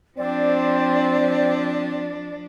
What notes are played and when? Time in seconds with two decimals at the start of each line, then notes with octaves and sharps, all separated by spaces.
0.18 F3 C4 D4 D5